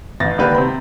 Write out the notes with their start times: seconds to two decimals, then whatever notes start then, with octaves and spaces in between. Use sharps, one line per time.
0.20 A1 A6 A#6
0.38 D3 D#3 A#3 G4 B4
0.54 C3 C5 B5